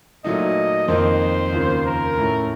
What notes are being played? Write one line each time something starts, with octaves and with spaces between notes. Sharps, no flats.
A#2 F#3 A3 D#4 D#5
F2 D#3 A#3 D#4 C5
D#2 C#3 F3 A#3
A#4
A2 A3 C#4